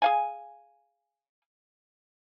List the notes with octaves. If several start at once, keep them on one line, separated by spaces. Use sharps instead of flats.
G#4 F5 G#5